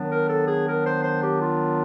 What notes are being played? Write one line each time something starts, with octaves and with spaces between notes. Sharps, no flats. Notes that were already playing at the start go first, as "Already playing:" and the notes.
Already playing: D#3 F#3 B3 D4
A#4
A4
G#4
A#4
C5
C5
G4
F4